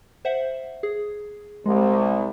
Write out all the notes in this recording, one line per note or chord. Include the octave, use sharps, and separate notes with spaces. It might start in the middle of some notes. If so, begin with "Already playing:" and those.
C5 E5 F#5
G#4
C2 G#3